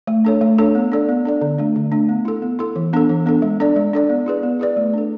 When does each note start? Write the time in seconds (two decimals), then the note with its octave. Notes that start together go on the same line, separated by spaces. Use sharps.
0.07 A3
0.25 D4 A4 C#5
0.41 A3
0.58 D4 A4 C#5
0.75 B3
0.92 D4 A4 D5
1.09 B3
1.25 D4 A4 D5
1.41 D3
1.58 A3 D4
1.76 D3
1.92 A3 D4
2.09 B3
2.25 E4 A4
2.42 B3
2.59 E4 A4
2.76 E3
2.93 B3 D4 A4
3.09 E3
3.26 B3 D4 A4
3.42 G#3
3.60 D4 A4 D5
3.76 G#3
3.93 D4 A4 D5
4.09 B3
4.26 E4 G#4 B4 D5
4.43 B3
4.59 E4 G#4 B4 D5
4.77 A3
4.93 D4 A4